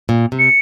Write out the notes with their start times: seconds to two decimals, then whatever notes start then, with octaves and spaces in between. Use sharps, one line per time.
0.09 A#2
0.32 C3
0.39 C#7